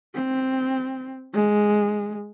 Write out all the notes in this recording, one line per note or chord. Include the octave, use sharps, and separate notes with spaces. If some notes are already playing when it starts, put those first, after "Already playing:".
C4
G#3